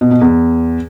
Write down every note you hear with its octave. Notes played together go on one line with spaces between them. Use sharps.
B2
B2
E2